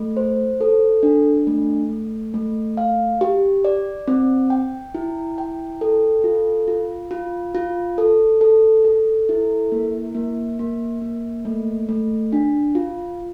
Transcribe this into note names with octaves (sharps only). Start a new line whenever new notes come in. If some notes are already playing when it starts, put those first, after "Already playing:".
Already playing: A3
C5
A4
D4
A3
A3
A3
F5
G4
D5
C4
G5
E4
G5
A4
F4
F4
F4
F4
A4
A4
A4
E4
A#3
A#3
A#3
A#3
A3
A3
D4
F4